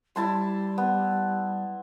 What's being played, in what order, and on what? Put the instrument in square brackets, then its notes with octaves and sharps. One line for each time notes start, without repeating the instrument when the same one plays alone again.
[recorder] G3 [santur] E4 A5 C6
[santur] B3